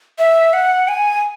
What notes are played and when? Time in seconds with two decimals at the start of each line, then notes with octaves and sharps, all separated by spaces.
0.18 E5
0.53 F#5
0.88 G#5